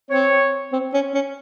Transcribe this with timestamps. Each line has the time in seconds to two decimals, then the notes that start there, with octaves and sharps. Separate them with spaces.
0.10 C4 C#5
0.72 C4
0.93 C#4
1.14 C#4